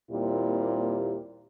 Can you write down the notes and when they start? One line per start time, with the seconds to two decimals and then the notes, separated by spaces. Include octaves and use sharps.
0.11 D#2 A#2 G3 C4 E4 G4